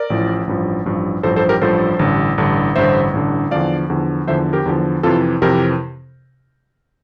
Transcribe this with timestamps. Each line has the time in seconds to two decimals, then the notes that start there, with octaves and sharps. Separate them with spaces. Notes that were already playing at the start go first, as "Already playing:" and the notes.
Already playing: A#4 D5
0.10 A1 A2 F3
0.47 A1 G2 F3
0.85 A1 G2 F3
1.23 A1 G2 F3 A4 C5
1.36 A4 C5
1.49 G4 A#4
1.61 A1 G2 F3 A4 C5
1.99 A1 G2 D3
2.38 A1 G2 D3
2.76 A1 G2 D3 C5 E5
3.13 A1 G2 D3
3.51 E2 D3 F3 D5 F5
3.90 E2 D3 F3
4.27 E2 D3 F3 C5 E5
4.53 G4 A#4
4.66 E2 D3 F3
5.03 F2 C3 E3 F4 A4
5.42 F2 C3 E3 G4 A#4